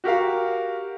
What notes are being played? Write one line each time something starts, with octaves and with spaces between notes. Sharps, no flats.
F#4 G4 A#4 F5